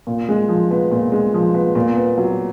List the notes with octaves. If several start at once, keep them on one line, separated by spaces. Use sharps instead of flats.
A#2
G#3
F3
B3
A#2
G#3
F3
B3
A#2
B3
F#3